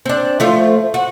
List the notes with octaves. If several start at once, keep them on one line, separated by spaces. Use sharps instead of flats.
C4 D4
F3 A3 F4
F#4